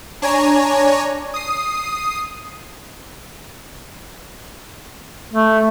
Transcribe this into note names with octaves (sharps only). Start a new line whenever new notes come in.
D4 C#5 G#5 A#5
D#6 C7
A3